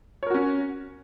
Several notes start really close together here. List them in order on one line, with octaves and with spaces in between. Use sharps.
C#5 A#4 F#4 C#4